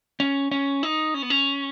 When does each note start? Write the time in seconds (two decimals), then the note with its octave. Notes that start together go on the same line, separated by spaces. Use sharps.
0.20 C#4
0.51 C#4
0.83 D#4
1.14 C#4
1.22 B3
1.30 C#4